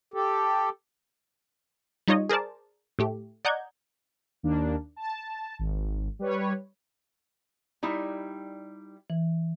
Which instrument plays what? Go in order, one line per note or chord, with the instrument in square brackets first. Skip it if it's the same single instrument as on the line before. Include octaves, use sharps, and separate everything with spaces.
[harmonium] G4 A4
[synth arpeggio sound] G3 D#4 F4 C#5 D#5
G#4 A#4 C5 D5 A5
A2 A3 G4
D5 D#5 F#5 A#5 G6 G#6
[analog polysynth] D#2 A#3 D4
A5
G#1
G3 B4 C#5
[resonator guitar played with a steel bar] G3 D#4 E4
[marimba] E3